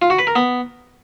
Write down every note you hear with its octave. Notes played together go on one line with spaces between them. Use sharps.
F4
F#4
B4
A#4
B3